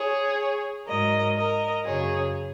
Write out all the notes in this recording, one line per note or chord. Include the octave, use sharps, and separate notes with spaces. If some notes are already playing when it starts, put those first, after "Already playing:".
Already playing: G#4 C#5
G#2 F#3 A#4 D#5
A#4 D#5
F#2 C#3 F#3 G#4 C#5